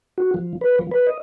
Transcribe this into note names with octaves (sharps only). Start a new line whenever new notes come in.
F#4
F3
B4
F3
B4
D#5